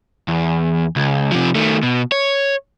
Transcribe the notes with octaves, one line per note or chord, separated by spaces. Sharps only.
E2
C#2
C3 F3
D#3 A3
B2
C#5